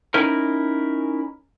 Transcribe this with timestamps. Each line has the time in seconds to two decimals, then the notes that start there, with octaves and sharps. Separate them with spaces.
0.14 C#4 D#4 E4 A#4